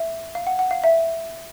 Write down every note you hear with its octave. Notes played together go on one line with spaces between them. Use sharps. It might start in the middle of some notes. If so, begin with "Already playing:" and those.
Already playing: E5
F5
F#5
F#5
F5
E5